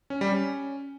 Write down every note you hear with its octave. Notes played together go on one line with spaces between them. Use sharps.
C#4
G3
C#4